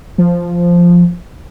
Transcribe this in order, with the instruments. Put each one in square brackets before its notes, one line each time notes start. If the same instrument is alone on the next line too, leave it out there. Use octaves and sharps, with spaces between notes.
[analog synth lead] F3